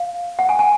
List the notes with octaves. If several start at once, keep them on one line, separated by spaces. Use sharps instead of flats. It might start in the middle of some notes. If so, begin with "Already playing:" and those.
Already playing: F5
F#5
G#5
G#5